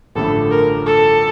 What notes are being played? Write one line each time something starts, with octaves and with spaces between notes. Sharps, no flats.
A1 G2 D3 F3 A3 A4
A#4
A4